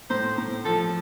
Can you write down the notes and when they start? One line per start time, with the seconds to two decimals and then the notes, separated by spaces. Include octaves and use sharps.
0.10 A2 C5
0.38 A2
0.65 F3 A4